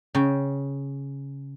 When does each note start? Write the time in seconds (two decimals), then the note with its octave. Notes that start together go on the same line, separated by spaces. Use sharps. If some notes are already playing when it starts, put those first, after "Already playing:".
0.15 C#3 G5